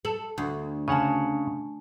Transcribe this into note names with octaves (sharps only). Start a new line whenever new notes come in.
A4 F#7
D2
C#3 C#5 F#5 G#5 A5